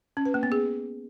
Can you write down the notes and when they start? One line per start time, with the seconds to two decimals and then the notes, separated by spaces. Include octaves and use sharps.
0.17 C#4
0.25 B4
0.34 A#3
0.43 B3
0.52 G#4